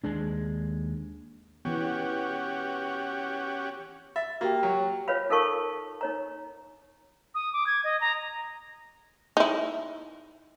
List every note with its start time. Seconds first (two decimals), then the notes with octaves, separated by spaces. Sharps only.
0.04 D#2 G#3 D4
1.65 E3 B3 C#4 F#4 G4
4.16 E5 A6
4.41 A#3 F#4 G4 G5
4.63 F#3
5.08 F4 B4 C#5 F5 B5
5.30 D#4 A4 A#4 F5 A5 C#6
6.01 D#4 C#5 A#5
7.35 D#6
7.53 D6
7.67 G#6
7.84 D#5
8.01 A#5
9.37 D#4 E4